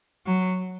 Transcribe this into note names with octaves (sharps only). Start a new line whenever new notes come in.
F#3